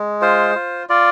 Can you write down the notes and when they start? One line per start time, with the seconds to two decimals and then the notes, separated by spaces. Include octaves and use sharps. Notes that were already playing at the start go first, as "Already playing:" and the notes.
Already playing: G#3
0.21 F4 C5
0.55 F4
0.89 F4 D5